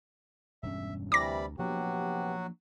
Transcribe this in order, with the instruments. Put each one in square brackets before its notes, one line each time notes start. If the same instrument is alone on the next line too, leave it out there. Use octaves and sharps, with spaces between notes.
[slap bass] E1 G2 C#4 [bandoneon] E5
[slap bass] D2 [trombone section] C3 E3 [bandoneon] G3 D5 B5 [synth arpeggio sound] D6 A#6
[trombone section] C3 B3 G4 [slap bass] F3 A#3 D4 [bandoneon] F#3 F#4